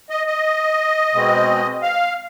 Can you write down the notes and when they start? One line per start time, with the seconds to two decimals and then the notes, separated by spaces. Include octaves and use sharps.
0.10 D#5
0.27 D#5
1.13 B2 G#3 C4
1.83 F5